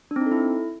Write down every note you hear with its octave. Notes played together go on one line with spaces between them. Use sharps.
D4
C4
D#4
A4
E4